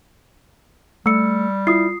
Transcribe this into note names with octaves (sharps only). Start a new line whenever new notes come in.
G3 A3 E6 C#7
E4 F4 D#6 C7